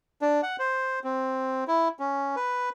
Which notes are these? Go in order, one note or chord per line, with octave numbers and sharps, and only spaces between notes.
D4
F#5
C5
C4
E4
C#4
B4